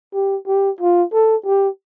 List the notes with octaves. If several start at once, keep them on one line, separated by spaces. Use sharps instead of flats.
G4
G4
F4
A4
G4